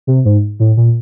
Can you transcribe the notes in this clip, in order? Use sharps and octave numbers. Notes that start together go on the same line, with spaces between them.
C3
G#2
A2
A#2